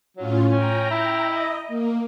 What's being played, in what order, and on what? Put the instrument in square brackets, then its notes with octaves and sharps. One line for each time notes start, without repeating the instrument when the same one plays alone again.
[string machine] A2 C#4 F4 [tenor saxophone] F#3
[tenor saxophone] C#4 [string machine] G5 A#5
[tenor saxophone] E4
[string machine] D#5
A#3